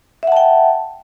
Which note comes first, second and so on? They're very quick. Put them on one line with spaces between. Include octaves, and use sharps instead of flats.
E5 F#5 A5 G5